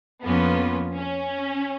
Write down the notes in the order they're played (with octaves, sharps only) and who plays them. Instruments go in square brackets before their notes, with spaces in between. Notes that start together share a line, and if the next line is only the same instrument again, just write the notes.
[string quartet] F2 F3 A#3 C#4 F4 [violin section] B3
[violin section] C#4